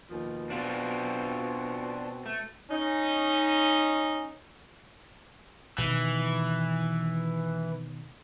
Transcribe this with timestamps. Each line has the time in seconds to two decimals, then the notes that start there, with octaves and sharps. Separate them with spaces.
0.09 D#2 B2 F3
0.50 B2 C4 D4 F4 F#4
2.26 A3
2.71 C#4 D#4
5.78 B2 D#3 E3